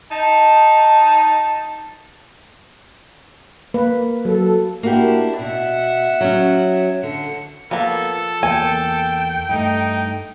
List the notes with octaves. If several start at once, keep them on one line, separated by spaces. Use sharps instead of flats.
D#4 A5
A#3 B4
F#3 A4
A#3 D4 E4 F#4 G4
B2 E5 F#5
F#3 C#4
D3 C#7
F3 A#3 B3 A4
E2 A#3 G5 G#5
G2 A3 D#4